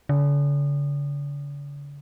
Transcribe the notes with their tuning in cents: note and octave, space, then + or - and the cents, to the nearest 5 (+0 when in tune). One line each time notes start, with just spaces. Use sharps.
D3 -45